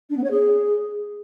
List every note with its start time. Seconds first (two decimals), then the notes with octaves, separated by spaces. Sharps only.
0.09 D4
0.16 B3
0.23 C#5
0.30 G#4